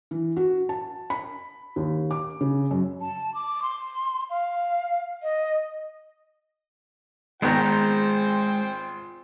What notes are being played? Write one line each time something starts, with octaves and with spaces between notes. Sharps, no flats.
E3
F#4
A5
B5
D#2
D6
C#3
F#2
A5
D6
C6
F5
D#5
G#1 D#3 G#3 B3 F4 C5 G5 A#5